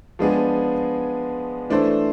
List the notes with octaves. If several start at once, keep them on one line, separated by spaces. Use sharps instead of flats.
F3 G#3 B3 D4 G#4
E3 A3 D4 A4 C5